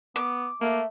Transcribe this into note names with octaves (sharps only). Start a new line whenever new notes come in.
B3 D6
A3 A#3 E5